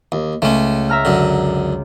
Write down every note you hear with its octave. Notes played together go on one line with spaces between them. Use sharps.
D#2
C#2 A3 C#4
E5 A#5 F6
F#2 D3